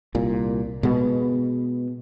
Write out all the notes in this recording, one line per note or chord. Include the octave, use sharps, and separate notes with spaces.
C2 A#2
B2 G#3 B3